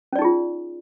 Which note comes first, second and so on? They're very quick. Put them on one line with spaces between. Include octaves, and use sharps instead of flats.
C#4 D5 D#4 G#4 F4